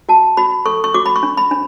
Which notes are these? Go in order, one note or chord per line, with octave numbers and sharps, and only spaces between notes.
F#4 A5
F#4 B5
A4 C#6
C#6
F#4 D6
B5
C#6
D4
B5
D4